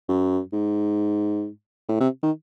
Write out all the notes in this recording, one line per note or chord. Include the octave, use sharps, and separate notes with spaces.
F#2
G#2
A2
C3
D#3